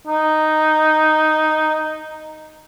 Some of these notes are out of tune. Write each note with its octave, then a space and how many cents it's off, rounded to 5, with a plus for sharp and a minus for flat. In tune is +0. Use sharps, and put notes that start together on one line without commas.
D#4 -5